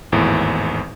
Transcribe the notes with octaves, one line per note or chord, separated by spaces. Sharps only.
G#1 E2 A2